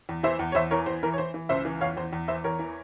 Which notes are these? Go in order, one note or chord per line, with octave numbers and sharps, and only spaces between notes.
E2
E3 C5 E5
E2
C#5
E2 C5 E5
E3 A#4 C#5
E2 C5
E3 A#4
C#5
E3 C5
E3
C#2 C5 E5
E3
E2 C#5 F5
E2 C5
E2
E3 C5 E5
E2 A#4 C#5
E3